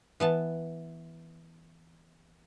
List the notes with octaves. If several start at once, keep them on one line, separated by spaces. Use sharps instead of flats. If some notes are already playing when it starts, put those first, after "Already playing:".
E3 B3 A5